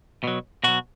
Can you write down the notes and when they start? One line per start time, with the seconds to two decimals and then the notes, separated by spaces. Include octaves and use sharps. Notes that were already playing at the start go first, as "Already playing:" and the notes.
0.24 B2 F#3
0.64 B2 F#3 F#4